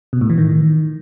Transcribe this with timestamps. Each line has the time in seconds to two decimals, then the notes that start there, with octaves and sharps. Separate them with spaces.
0.13 B2
0.21 A2
0.30 E3
0.38 D#3